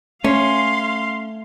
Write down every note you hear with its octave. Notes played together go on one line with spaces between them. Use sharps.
A3 C#4 F5 C6